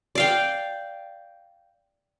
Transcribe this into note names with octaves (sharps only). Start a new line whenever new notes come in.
D5 F5 G5